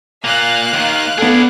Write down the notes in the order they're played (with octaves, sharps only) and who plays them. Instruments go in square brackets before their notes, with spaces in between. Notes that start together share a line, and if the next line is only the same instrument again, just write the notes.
[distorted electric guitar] A#2 A#3 [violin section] F5 F#6
[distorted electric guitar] D#2 D#3
[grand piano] B3 A4 [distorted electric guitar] G#4 D5